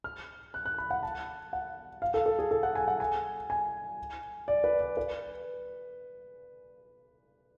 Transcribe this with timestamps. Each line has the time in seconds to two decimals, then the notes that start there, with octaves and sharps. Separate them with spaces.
0.04 F6
0.54 F#6
0.66 F#6
0.78 B5
0.91 F#5
1.03 A5
1.53 F#5
2.02 F5
2.14 A4
2.26 A4
2.39 G#4
2.51 A4
2.63 F#5
2.75 G#5
2.88 F#5
3.00 G#5
3.50 G#5
4.48 D5
4.64 B4
4.81 D5
4.97 B4